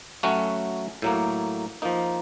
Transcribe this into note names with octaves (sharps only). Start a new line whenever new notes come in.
F#3 A3 C#4 F#4
A2 F#3 A#3
F3 A#3 D#4